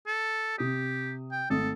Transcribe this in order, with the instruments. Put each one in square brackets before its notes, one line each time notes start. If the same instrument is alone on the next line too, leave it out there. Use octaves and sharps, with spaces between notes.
[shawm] A4
[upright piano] C3 D#6 [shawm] G4
[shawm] G5
[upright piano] G#1 A3 D#6 [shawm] A4